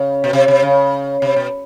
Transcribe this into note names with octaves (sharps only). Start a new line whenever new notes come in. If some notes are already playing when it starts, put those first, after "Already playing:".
Already playing: C#3
B2
C3
C3
C#3
C3
B2